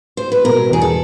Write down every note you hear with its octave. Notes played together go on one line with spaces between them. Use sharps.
C5
B4
B2 A#4
E2 G#4
A4